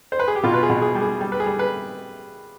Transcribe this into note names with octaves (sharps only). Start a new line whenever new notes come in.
C5
B4
G#4
G4
B2 F4
B4
G#4
B2
G#4
G3
G#4
G3
B4
G#4
G3
B4